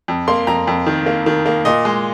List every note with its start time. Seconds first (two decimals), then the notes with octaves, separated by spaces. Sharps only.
0.08 F2
0.28 A#3 C6
0.47 F2 A#5
0.67 F2
0.87 D#3
1.06 A#3
1.26 D#3
1.46 A#3
1.65 A#2 D#5
1.85 G#3